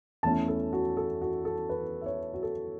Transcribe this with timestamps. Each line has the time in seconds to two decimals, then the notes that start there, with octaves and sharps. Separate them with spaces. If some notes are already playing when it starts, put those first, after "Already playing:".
0.23 E2 E3 A3 C#4 E4 A5
0.48 A4
0.73 F#4
0.97 A4
1.22 F#4
1.45 A4
1.69 B4
2.01 E5
2.06 C#5
2.34 F#4
2.43 A4